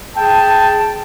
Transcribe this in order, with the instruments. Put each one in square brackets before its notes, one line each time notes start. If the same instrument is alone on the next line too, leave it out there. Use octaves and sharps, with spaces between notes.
[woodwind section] G#4 G5 A5